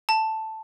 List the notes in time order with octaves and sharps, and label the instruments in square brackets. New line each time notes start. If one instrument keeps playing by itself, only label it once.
[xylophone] A5